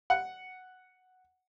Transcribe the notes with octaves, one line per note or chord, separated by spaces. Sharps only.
F#5